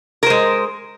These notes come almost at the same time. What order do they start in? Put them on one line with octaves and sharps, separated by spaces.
A#4 C5 G#3